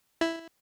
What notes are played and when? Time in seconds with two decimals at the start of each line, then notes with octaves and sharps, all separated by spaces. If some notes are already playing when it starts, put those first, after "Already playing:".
0.21 E4